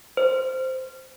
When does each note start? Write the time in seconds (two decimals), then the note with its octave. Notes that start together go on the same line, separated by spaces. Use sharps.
0.17 C5